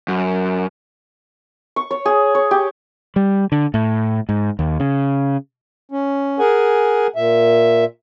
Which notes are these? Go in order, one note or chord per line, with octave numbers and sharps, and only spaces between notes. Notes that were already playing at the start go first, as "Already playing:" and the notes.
F#2
C#6
C#5
G#4
C#5
G4
G3
D3
A2
G#2
D#2
C#3
C#4
G#4 A#4 F#5 G#5
A#2 E5